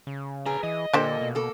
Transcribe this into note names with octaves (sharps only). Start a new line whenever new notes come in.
C#3
G#4 B4 A#5
E3 D#5
A#2 D3 A#3 D4 G4 A4 C5
B2
A#3 A4